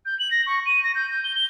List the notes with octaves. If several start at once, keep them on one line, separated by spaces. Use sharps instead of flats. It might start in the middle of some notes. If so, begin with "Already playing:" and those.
G6
F#7
A#6
C#6
D#7
A#6
G6
G6
G7
G7